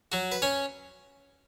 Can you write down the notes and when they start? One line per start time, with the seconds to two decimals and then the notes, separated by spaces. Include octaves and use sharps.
0.12 F#3 F#4
0.32 B4
0.42 C#4 C#5